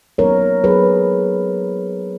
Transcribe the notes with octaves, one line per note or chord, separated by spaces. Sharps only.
F#3 B3 D#4 A#4 C#5
F#3 B3 D#4 G#4 B4